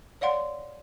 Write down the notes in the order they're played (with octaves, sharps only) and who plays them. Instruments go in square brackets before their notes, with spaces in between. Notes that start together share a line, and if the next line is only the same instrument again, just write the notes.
[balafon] C#5 D5 F5 F#5 C6